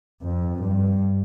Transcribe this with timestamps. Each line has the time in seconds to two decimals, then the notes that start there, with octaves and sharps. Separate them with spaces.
0.23 F2
0.62 G2